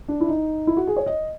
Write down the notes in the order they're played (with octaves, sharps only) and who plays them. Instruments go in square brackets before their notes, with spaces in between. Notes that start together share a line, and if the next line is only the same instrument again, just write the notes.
[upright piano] D4
E4
D#4
E4
F#4
G#4
C#5
D#5